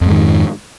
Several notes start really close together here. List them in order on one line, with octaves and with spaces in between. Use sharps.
F2 G#2 D#3